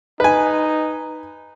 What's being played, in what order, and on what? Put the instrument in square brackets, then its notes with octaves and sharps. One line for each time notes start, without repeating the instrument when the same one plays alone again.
[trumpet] D#4 [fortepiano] B4 G#5